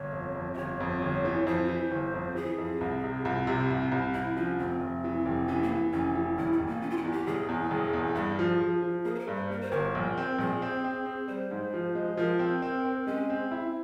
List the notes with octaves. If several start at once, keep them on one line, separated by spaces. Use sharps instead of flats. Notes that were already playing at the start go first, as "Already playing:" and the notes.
Already playing: G1 C#5
F2
F2
E5
G1 C#5
F2
G1
E3
F2 C5
E3
G1
F2
E3 G#4
F2
C2
C3
C2 F4
C3
C2
C2
C2 E4
F3 C#4
F1 C4
F1
E3
F1
E3 C#4
A#3
E3
F1 C#4
E3
E1 E4
E4
E1
A#3
E3 C#4
F4
E4
E2
G4
E1 G#4
E2
E1
E2
G2 G#4
F3
F3
F3
A#3 G#4
C5
A#4
G2
C5
A#3 A#4
C5
G1 A#4
A#1
C4
A#1 G#4
C4
C4
C4
G3 C5
G#2
F3
G#3
F3 A#4
C4
C4
C4
G#3 C#4
C4
E4